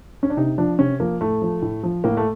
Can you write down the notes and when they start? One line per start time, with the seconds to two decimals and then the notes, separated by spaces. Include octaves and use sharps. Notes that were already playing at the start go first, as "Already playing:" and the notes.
0.23 C#4
0.30 D4
0.37 C3 D#4
0.58 F3 D4
0.79 C3 C#4
1.00 F3 A#3
1.21 A2 A3
1.42 F3
1.62 A2
1.83 F3
2.04 A2 A#3
2.17 A3